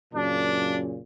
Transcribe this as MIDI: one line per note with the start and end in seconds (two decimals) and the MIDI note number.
0.14 1.01 42
0.14 1.01 46
0.14 1.01 49
0.14 0.77 62